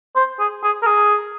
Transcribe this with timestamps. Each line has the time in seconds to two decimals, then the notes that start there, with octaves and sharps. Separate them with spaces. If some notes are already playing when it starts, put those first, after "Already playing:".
0.16 C5
0.40 G#4
0.63 G#4
0.82 A#4
0.86 G#4